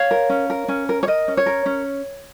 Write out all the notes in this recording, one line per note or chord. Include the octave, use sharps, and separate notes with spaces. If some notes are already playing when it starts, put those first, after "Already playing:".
Already playing: C#5 F5
A#4
C#4
A#4
C#4
A#4
C#5
A#4 D#5
C#4
C#5
A#4
C#4